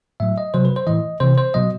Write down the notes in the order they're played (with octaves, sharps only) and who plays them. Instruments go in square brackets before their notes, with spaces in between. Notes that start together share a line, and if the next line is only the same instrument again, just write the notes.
[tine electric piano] A2 F#3 E5
D#5
C3 F#3 C5
B4
C5
A2 E3 D#5
C3 E3 C5
C5
B2 F#3 D#5